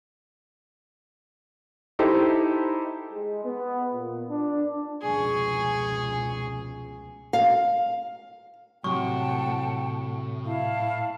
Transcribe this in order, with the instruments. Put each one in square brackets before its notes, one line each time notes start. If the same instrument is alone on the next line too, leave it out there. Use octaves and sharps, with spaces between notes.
[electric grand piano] D#4 E4 G4 A4 C5
[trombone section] G#3
B3
A#2
D4
[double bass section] F1 C#2 B2 [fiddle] G#4 C#6
[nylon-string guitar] F5
[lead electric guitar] A2 [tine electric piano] C3 F#3 [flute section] F#5 G5 A5 [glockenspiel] C#6
[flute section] E4 F5 A5